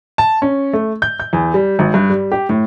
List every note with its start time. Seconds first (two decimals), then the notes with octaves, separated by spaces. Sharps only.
0.18 A5
0.42 C#4
0.73 A3
1.02 G6
1.20 G6
1.33 E2
1.54 G3
1.79 G#1
1.94 G2
2.10 G3
2.32 G4
2.49 A2